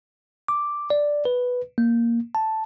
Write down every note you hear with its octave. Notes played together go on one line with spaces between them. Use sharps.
D6
D5
B4
A#3
A5